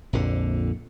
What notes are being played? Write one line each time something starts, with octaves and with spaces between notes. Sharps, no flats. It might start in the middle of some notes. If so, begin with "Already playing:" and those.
A#1 F2 D3